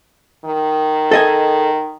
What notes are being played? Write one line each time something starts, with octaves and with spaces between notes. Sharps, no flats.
D#3
A4 D#5 G#5